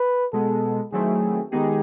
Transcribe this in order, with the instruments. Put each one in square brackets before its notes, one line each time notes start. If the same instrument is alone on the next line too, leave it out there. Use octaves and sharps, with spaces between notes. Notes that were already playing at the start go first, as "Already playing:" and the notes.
Already playing: [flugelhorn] B4
[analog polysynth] B2 G#3 B3 [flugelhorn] A4
[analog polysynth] D#3 F#3 A3 C4 E4 [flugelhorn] G#4
[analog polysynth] D#3 G#3 B3 D#4 G#4 [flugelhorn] G4